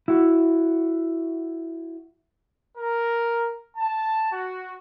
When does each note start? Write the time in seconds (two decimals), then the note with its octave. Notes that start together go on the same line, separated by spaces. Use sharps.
0.08 E4 F#4
2.77 A#4
3.77 A5
4.32 F#4